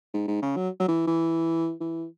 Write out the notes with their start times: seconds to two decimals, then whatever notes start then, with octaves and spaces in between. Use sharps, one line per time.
0.14 G#2
0.28 G#2
0.42 C#3
0.56 F#3
0.80 F#3
0.88 E3
1.07 E3
1.80 E3